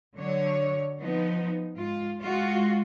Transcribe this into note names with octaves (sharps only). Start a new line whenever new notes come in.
D3 F#3 C#5
F3 B3 D#4
G#2 F4
G#3 F4 F#4